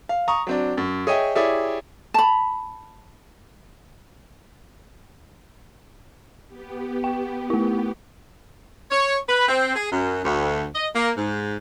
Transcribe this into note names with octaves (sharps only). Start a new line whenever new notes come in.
F5
A#5 C#6 D#6
F#3 C4 D4
F#2
G#4 C#5 D#5 E5 G5
E4 G4 G#4 C#5 D5 E5
A5 B5
B3 G4
G5
A3 E4
C#5
B4
C4
G#4
F#2
D2
D#5
A#3
G#2